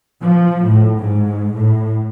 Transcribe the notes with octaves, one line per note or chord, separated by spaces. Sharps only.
F3
A2
G#2
A2